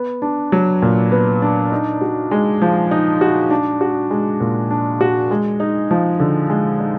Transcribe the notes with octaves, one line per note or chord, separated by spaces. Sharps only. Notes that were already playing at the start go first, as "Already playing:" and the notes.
Already playing: B3
D4
F#3
A#2
B3
D4
D#4
F#4
G#3
F3
D#4
F#4
D4
F#4
G#3
A#2
D4
F#4
G#3
D#4
F3
D3
G#3
D#4